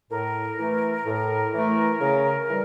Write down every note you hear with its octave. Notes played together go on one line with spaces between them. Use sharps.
A2 A#4
E3 A3
A2
E3 A3
C#3
E3 G3